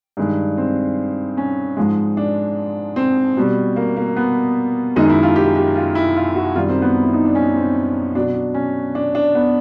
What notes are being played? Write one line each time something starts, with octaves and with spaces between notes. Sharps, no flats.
G2 D#3 G#3
C4
C#4
G#2 F3 G#3
D4
C4
B2 G3
A#3
A#3
B3
F#2 D#3 G#3 D#4
E4
F4
G4
G4
F4
E4
F4
F#4
F#2 D#3 G3 F4
C4
B3
E4
D#4
D4
C#4
C4
B2 F#3 D4
D4
C#4
D4
D4
B3